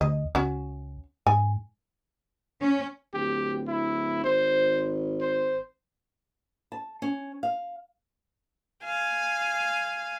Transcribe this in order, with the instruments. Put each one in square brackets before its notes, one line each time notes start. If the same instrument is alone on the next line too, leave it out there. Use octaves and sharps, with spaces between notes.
[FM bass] D2 [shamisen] D#5
[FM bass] C#2 [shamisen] C#4 F#4
[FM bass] G#2 [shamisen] G#5
[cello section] C#4
[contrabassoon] D1 [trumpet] G4
[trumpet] E4
[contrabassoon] G#1 [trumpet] C5
[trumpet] C5
[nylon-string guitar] A5
C#4
F5
[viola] F5 G#5